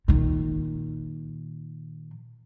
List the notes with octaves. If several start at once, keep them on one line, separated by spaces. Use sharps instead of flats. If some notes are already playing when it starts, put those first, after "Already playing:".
A#2 D#3